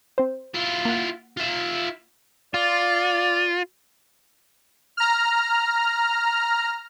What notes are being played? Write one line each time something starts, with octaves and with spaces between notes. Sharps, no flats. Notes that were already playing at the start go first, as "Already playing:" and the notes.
C4 C5
E4 F4
A#3 F#5
F4 E5
F4 D5
A#5 F6